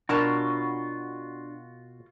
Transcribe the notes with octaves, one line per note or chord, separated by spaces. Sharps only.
B2 D4 F4 F#4 A#4 C#5 A5